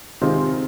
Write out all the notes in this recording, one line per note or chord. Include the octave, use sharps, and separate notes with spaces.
C3 D#3 G#3 C4 F4